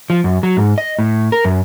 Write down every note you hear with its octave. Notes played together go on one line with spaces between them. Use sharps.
F3
F#2
F#3
G#2
D#5
A2
A#4
F#2